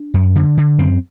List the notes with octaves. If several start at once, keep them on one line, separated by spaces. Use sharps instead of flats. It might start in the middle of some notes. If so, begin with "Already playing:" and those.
Already playing: D4
F#2
D3
D3
F#2 C4